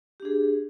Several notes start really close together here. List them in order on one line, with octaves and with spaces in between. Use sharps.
G4 D4 G#4